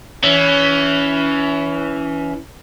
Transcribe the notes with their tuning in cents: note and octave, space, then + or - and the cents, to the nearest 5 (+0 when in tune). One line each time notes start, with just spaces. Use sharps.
E3 +0 C#4 +25